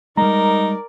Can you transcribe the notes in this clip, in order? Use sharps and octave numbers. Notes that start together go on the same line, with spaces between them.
G3 G#3 D#4 A#4 D5 A#5